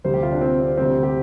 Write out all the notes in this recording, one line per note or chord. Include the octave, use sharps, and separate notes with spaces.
D2 C3 G3 C5
G4
F4
D4
C4
C4
D2 C3 G3 C4
G4